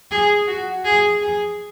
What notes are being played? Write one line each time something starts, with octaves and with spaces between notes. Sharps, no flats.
G#4
F#4
G#4
G#4